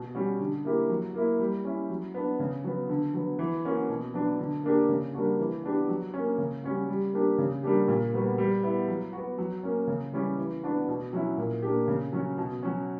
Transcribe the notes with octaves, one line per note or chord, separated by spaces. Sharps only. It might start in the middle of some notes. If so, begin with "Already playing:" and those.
Already playing: B2
G3 C#4 F#4
D3
A#3 E4 G4
F#3
A#3 E4
G3
C#4 E4
F#3
B3 D4
C#3
F#3 B3
D3
F#3 B3
E3
A#3 C#4 F#4
B2
F#3 B3 D4
D3
A#3 D4 G4
C#3
G3 A#3 D4 F#4
E3
B3 D4 G4
F#3
A#3 C#4
C#3
G3 C#4 F#4
G3
A#3 D4 G4
C#3
G3 A#3 D4 G4
A#2
G3 B3 F#4
G3
B3 E4
F#3
B3 F#4
F#3
A#3 C#4
C#3
E3 G3 C#4 G4
E3
B3 D4 F#4
B2
F#3 C#4 E4
A#2
A#3 D4 G4
C#3
F#3 C#4
B2
F#3 C#4